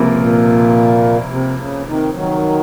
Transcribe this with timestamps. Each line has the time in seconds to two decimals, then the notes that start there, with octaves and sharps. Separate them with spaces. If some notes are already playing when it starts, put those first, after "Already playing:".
Already playing: C#2 C3 F3 A#3
0.17 A#2
1.30 C3
1.57 C#3
1.85 C3 D#3
2.14 D#3 F#3